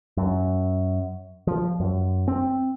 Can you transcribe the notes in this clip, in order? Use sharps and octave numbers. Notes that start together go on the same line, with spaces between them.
F#2
F3
F#2
C4